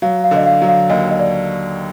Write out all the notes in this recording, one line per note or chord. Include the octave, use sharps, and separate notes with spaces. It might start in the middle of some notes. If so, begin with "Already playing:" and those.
F#3 F5
F5
D3
D#5
F5
F#3
F5
D#2 D#5
D#5
D5